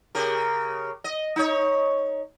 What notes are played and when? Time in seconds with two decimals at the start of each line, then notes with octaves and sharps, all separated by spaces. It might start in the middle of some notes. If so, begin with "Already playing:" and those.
0.15 C#3 G4 A#4
1.04 D#5
1.36 D#4 C#5